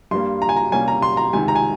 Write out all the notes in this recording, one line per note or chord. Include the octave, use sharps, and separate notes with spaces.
G2 G3 A#3 C6
A#5
G#5
A#5
C3 G3 A#3 C#4 G#5
A#5
C6
A#5
C#2 C3 D#3 G#5
A#5
G#5